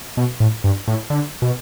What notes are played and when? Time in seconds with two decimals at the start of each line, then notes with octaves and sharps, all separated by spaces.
0.17 B2
0.40 A2
0.64 G2
0.88 A2
1.10 D3
1.42 B2